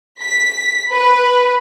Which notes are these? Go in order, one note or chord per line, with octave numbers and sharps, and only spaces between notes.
B6
B4